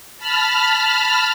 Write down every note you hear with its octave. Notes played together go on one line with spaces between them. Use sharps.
A5 B5 F6